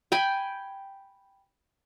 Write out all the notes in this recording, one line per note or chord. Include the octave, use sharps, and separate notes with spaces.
G5 G#5 B5